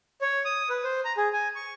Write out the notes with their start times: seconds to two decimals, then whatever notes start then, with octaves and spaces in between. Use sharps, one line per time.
0.22 C#5
0.45 D#6
0.70 B4
0.84 C5
1.05 A#5
1.17 G#4
1.33 G#5
1.55 C#6